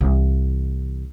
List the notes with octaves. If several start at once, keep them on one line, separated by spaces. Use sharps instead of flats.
C2 E3